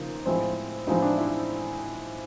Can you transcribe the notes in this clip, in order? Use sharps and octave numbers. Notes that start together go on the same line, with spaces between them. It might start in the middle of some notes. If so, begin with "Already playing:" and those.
Already playing: C#3 F3 A#3 D#4
A2 F3 G#3 C4
A2 F3 G#3 C4 D#4
D4
E4